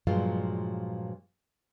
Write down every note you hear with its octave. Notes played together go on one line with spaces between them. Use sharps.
G2 A#2 F3 F#3 G#3 F4